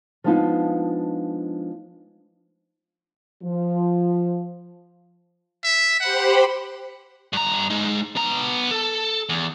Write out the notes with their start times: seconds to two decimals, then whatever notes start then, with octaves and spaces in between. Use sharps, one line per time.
0.24 F3 G#3 B3 D4 D#4 F4
3.43 F3
5.64 E5
6.01 G4 C5 F#5 B5
7.33 G2 A#5
7.70 G#3 D#4
8.16 B3 A#5
8.71 A4
9.29 E2